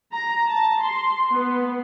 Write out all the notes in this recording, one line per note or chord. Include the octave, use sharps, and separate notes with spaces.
A#5
A5
C6
B3